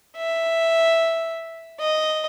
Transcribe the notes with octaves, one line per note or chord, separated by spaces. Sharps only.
E5
D#5